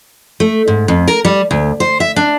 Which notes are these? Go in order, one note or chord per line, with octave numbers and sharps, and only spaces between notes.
A3
G#2
F2
A#4
G3
D2
C5
E5
D4